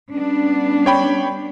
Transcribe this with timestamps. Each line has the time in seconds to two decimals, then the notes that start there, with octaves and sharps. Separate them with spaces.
0.13 G3 B3 C#4 D4
0.86 C#5 G5 B5